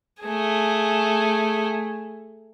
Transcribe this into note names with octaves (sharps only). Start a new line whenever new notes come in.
A3 G#4